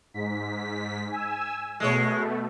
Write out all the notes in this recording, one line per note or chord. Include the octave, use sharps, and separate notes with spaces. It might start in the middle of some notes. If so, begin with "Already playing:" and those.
G#2 B6
G#5 E6
B2 G#3 A3 C#5